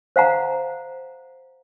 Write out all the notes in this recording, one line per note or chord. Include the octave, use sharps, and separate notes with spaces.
C5 F5 F#5 A#5